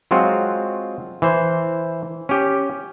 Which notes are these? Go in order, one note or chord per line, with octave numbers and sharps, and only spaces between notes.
F#3 G#3 C4 F4 F#4
E3 C5
C#4 G4